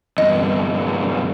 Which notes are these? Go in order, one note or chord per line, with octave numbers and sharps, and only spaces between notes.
E2 G2 D#5